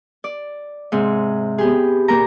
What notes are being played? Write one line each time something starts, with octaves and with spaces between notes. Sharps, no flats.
D5
G#2 C3 G#3
B3 G4 G#4
A#2 A#3 A#5